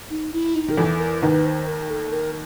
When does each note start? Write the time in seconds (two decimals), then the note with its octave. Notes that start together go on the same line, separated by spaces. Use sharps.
0.10 D#4
0.33 E4
0.55 D#4
0.68 D#3 A#4
0.77 E2 E3 A4
1.00 A#4
1.22 D#2 D#3 B4
1.45 C5
1.67 A#4
1.90 A4
2.12 A#4